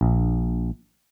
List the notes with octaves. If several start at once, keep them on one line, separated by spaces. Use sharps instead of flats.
A#1